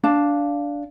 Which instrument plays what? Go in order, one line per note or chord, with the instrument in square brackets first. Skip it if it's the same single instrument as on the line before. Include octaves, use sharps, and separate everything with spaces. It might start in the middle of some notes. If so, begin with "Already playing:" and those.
[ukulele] D4 F5 A5